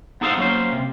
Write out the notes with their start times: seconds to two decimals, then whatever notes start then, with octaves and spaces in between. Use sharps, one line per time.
0.21 B3 D#4 G#4 A4 C5 F5
0.37 F#3 A#3 C#4 C5
0.72 C3